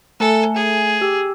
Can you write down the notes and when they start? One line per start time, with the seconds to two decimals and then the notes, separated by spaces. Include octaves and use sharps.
0.20 A3 A4 G#5 C#7
0.56 G#4
1.01 G4 E6